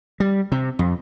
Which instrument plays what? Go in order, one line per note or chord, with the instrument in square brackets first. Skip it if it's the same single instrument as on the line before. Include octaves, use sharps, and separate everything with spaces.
[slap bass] G3
C3
F2